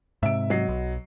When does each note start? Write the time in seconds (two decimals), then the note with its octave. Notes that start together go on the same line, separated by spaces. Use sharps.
0.23 G#2 C3 E5 D7
0.50 F#3 D#5 C7
0.68 B1